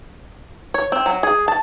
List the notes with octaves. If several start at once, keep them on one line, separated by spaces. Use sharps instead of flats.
C#5
C4
F#3
G#4
A5